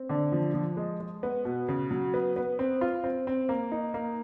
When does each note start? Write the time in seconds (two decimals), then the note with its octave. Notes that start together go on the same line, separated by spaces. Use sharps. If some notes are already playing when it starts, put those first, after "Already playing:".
Already playing: C4
0.09 D3
0.32 F3
0.54 F3
0.77 G#3
1.00 G#3
1.23 B3
1.45 B2
1.68 C#3
1.91 F#3
2.14 B3
2.36 B3
2.59 C4
2.81 F4
3.04 C4
3.27 C4
3.49 A#3
3.72 D#4
3.94 A#3